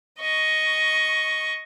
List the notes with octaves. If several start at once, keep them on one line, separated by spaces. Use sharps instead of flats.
D#5 C#6